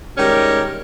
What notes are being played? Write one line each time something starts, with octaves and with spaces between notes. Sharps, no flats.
D#3 G3 G#3 C#4 G4 A#4